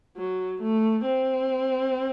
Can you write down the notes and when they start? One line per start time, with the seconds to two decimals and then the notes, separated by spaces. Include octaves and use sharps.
0.17 F#3
0.62 A3
1.06 C4